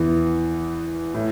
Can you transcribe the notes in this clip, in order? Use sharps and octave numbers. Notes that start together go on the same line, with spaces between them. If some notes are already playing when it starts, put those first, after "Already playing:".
Already playing: E2 E3 B3
A2